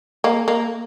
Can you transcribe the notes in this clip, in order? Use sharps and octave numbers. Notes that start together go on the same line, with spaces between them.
A#3
A#3